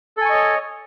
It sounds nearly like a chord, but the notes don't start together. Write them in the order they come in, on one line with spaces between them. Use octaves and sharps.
A4 G#5 C#6 D#5 C#5